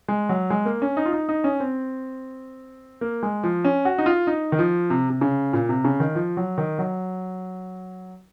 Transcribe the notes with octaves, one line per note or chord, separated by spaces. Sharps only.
G#3
F#3
G#3
A#3
C#4
D#4
F4
D#4
D#4
C#4
C4
A#3
G#3
F3
C#4
F#4
D#4
F4
D#4
D#3
F3
C3
C3
C#3
A#2
C3
C#3
D#3
F3
F#3
D#3
F#3